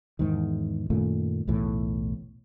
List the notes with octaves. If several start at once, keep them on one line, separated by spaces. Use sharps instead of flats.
E2 G#2 D#3
F#2 A#2 D#3 A3
B1 E2 A2 E3